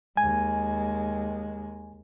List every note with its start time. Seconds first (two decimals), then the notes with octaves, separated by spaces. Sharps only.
0.17 D#2 G#3 G#5